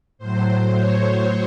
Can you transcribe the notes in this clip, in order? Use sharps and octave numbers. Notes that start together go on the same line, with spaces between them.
A2 F#3 C5
C#5